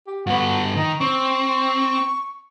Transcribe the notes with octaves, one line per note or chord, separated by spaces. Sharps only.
G4
G2 B3 F#4
D#3 D#4
C4 C#6